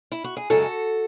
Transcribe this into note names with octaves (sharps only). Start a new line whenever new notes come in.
E4
F#4
G#4
F#2 C#3 G#3 F#4 A4